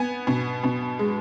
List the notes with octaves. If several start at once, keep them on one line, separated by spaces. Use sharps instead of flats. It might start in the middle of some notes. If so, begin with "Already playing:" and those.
Already playing: B3 G#5
B2
B2
G#3